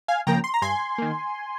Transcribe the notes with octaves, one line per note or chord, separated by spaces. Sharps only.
F5 G#5
C#3 F3 A#3 G5 A#5
C6
A#5
G2 G#5 C6
D#3 A#3